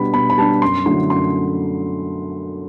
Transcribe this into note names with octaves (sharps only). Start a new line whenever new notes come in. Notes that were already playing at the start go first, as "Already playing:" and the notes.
Already playing: B2 G3 B3 D4 B5
B2 B5
B5
G3 B3 D4 A5
F#2 C6
D3 F#3 A3 E4 C6
F#2 C6